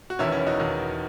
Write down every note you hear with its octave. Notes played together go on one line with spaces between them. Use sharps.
F#4
E1 E2 D#3 C#4 E4
C#4 E4
D#4 F#4
E1 E2 D#3